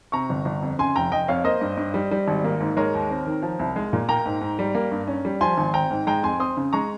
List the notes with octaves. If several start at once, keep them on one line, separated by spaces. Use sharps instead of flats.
C3 A#5 C#6
G1
G1
F2
C#3 G#5 C6
F1 G5 A#5
F1 D#5 G5
F2 C#5 F5
A#3 C5 D#5
G2
G2
G3
G3
G#1
A#3
G#2
G#3 A#4 C#5
D#2
C4
D#3
F3
C2
G#3
A#2
A#3 G5 A#5
G#2
G#2
G3
A#3
G2
C#4
G3
F3 G#5 C6
G#1
C4 G5 A#5
G#2
G#3 G5 A#5
F2 G#5 C6
C4 C6 D#6
C#3
G#3 A#5 C#6